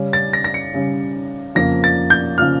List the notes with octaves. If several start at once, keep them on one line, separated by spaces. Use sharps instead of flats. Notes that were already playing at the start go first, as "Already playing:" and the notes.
Already playing: C#3 G3 C#4
A6
A#6
A#6
C#7
C#3 G3 C#4
F2 C#3 F3 A#3 A#6
A6
G6
C#3 F3 A#3 F6